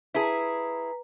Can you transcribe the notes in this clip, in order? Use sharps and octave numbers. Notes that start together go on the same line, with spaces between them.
E4 G#4 B4 A#5